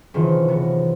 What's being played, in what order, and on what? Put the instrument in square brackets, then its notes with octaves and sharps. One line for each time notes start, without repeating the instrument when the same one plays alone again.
[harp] F#1 C3 D#3 E3 F4
C3 B3 A#4